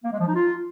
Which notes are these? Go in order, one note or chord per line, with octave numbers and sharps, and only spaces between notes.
A#3
G#3
F3
D#4
F4